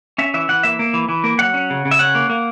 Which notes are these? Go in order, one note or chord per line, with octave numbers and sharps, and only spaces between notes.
C#4 E5
E3 E5
E3 F#5
A#3 E5
A#3
E3
E3
A#3
F#3 F#5
C#4
C#3
C#3
E5
C#4 F#5
A#3
A#3